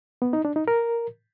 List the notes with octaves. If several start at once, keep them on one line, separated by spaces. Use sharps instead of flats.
B3
D#4
D4
D#4
A#4